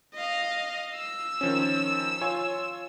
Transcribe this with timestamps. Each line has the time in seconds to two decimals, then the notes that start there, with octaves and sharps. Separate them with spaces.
0.14 D#5 F5
0.96 E6
1.41 D#3 F3 C#4
2.21 F4 C#5 G#5